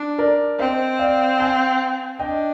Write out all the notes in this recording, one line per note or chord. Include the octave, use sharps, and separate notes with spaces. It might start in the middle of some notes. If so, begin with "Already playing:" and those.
Already playing: D4
A#4 D5
C4 C5 D#5
D5 F5
F5 G#5
D4 D#5 G5